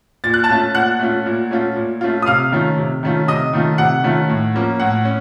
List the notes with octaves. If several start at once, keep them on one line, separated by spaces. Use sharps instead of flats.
A#2 A6
F#6
A5 A6
A3 C#4 F4
A#2 F#5 F#6
A3 C#4 F4
A#2
A3 C#4 F4
A#2
A3 C#4 F4
D#6
C3 F5 F6
D#3 A3 C#4 F4
C3
D#3 A3 C#4 F4
C3 D#5 D#6
D#3 A3 C#4 F4
C3 F#5
D#3 A3 C#4 F4
A2
F3 A#3 C#4
A2 F#5
C#4